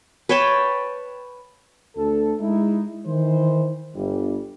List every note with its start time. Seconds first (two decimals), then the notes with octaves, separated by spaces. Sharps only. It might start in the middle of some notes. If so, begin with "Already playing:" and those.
0.29 B4 C#5 G5 A5
1.96 D2 A4
2.41 G#3 D#4 E4
3.07 D#3 E3 C5
3.96 G1 G3